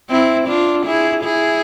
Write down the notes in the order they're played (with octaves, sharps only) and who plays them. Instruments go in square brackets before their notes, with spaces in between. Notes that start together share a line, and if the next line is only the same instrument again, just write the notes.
[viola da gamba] C4 E4
D4 F4
E4 G#4
E4 G#4